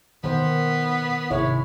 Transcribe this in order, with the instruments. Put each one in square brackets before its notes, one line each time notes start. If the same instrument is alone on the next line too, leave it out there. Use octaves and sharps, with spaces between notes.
[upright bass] B2 [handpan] D#3 C5 [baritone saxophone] B3
[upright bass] G#1 C3 [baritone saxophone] G#3 [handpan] E4 C#5